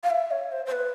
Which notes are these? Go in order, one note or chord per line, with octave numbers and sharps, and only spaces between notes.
F5
E5
C#5
C5
C5
B4